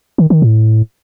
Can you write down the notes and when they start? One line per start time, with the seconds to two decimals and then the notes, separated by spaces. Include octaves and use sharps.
0.18 D#3
0.30 D#3
0.42 A2